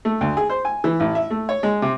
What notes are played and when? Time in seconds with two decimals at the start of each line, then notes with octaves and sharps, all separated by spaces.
0.05 A3
0.21 D2
0.37 G#4
0.50 C5
0.65 G#5
0.84 E3
1.00 A1
1.15 E5
1.31 A3
1.49 C#5
1.63 G#3
1.82 C3